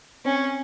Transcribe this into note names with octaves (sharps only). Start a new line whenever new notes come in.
C4 C#4